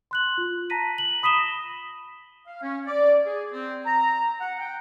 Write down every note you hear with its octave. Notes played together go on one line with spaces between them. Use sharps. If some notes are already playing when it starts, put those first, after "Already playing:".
C6 F#6 F#7
F4
A5 A#5 A#6 B6 D#7
F#7
B5 D#6 B6 D#7 E7 G7
A#6
F5
C#4
D5
G#4
C4
A#5
F#5
G5